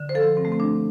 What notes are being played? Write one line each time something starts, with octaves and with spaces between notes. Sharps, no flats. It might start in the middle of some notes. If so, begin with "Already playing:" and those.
Already playing: D3
C5
F3 A4
G2 C4
A3
C4
G2 D4